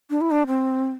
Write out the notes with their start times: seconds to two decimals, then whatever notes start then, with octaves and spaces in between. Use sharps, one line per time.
0.10 D4
0.21 E4
0.31 D4
0.47 C4